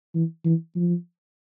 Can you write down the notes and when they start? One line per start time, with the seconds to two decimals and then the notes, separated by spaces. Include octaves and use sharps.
0.15 E3
0.45 E3
0.76 F3